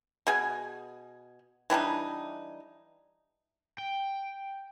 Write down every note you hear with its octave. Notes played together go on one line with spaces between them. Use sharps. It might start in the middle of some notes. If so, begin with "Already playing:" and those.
B2 G#4 G#5
E3 G3 D4 D#4
G5